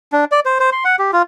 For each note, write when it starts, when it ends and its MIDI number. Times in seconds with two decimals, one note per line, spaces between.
0.12 0.25 62
0.32 0.40 74
0.45 0.58 72
0.60 0.70 72
0.72 0.84 84
0.84 0.96 78
0.99 1.11 67
1.13 1.22 65